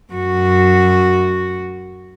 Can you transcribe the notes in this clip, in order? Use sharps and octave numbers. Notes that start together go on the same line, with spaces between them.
F#2 F#4